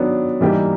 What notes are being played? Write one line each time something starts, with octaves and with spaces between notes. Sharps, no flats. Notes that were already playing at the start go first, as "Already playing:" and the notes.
Already playing: D#3 F#3 B3 D4
E3 G3 A#3 D#4 G4